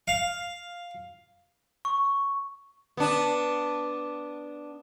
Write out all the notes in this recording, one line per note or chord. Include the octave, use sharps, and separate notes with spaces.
F5
C#6
B3 D4